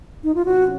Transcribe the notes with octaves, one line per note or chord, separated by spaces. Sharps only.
D#4
F4
C3 F#3 C#4 F#4